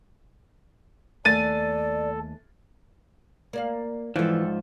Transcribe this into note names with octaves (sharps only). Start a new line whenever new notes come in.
D#2 A3 A4 D5 G#5 A6 D#7
A#3 D5 F5
G#2 E3 F3 G3 A4